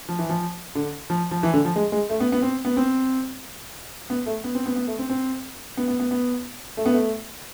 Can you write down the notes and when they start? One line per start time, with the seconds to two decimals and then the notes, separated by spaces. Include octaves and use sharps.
0.09 F3
0.19 E3
0.29 F3
0.75 D3
1.10 F3
1.31 F3
1.43 E3
1.54 D3
1.65 F3
1.76 G#3
1.92 G#3
2.10 A3
2.20 B3
2.32 B3
2.42 C4
2.65 B3
2.77 C4
4.10 B3
4.26 A3
4.44 B3
4.55 C4
4.66 B3
4.76 B3
4.87 A3
4.99 C4
5.10 C4
5.77 B3
5.88 B3
6.00 B3
6.11 B3
6.77 A3
6.86 B3
6.93 A3